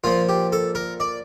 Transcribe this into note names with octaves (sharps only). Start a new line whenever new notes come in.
A#2 F3 F4
G4
A4
A#4
D5